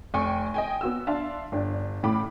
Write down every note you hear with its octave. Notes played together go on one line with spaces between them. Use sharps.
F1 G5 G#5 C#6
D#5 G5 G#5
B3 F#4 E6
D4 E5 F5 A5 C6
G1 D4 D5
A1 A2 B5 D6